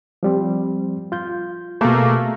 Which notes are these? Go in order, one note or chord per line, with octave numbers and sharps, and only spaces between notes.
F3 G3 C4
F4 G6
B2 A3 A#3 G#4